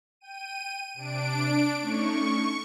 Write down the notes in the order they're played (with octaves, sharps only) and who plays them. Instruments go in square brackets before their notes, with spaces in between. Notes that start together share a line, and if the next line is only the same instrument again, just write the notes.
[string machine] G5 [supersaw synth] D#7
[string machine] C3 [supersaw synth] D4 D7
[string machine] A3 C#4 D#4 [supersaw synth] C#6